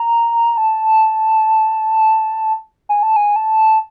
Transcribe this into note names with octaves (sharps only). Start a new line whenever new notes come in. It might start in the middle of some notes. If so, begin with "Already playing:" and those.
Already playing: A#5
A5
G#5
A5
G#5
A5